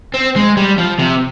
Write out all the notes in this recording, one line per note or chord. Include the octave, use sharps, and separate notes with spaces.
C4
G#3
G3
F3
C3